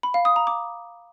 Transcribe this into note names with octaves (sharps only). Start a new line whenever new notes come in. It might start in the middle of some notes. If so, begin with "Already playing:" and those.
B5
F5
D#6
A#5
D6